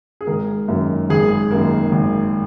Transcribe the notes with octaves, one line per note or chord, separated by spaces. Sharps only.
G#4
G#1 A#4
F#2 D#3 A#3
G#1 G#4
F#2 D#3 A#3
G#1